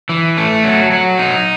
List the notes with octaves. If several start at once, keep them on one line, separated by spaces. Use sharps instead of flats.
E3
A3
F#3
F#3
D#4